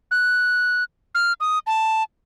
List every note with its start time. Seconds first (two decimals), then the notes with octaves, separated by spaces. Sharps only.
0.11 F#6
1.15 F6
1.41 D#6
1.67 A5